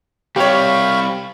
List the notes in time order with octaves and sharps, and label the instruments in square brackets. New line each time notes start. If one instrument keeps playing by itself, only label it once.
[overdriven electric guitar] G3 C4 [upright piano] G4 C#5 [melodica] F5 B5 C#6